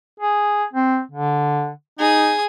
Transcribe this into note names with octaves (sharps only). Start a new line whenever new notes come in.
G#4
C4
D3
D#4 G#4 D#6